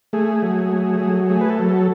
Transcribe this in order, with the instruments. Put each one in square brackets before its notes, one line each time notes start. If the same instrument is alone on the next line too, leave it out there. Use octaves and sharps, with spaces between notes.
[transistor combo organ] A3 G#4
F#3
A3
F#3
A3 G#4
B4
A4
F#3
A4